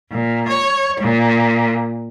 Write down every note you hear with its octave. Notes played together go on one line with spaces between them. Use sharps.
A#2
C#5
A#2